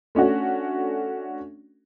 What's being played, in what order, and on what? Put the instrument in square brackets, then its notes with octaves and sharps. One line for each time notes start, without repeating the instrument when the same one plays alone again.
[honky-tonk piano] A3 C#4 D4 F#4